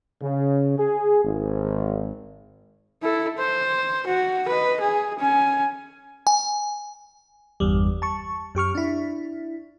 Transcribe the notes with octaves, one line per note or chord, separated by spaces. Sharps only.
C#3
G#4
G#1
E4 A4
C5
F#4
B4 D#5
G#4
C#4 G#5
G#5
G1 E2 G3
A5 C#6
F#2 G4 C#6 F6
D4 E4